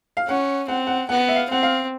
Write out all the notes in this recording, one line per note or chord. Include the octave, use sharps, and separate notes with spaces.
F5
C#4 F#5
C4 F#5
F#5
B3 F#5
E5
F5
C4 F#5
F5